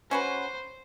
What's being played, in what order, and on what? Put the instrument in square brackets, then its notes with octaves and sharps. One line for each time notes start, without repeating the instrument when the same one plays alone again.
[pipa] C#4 F#4 B4 [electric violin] C5